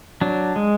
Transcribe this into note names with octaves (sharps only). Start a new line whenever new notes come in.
F#3 D4
G#3